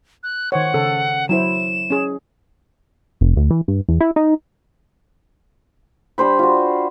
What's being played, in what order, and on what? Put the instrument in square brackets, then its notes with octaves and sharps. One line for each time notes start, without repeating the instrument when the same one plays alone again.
[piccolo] F#6
[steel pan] D#3 C5 C#5 [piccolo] F#5
[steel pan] C#3 A4
[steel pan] F#3 E4 C5 [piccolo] E7
[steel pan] C#4 G#4
[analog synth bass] F1
D2
E3
G2
E2
E4
D#4
[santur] G3 D4 C5 B5
F4 F#4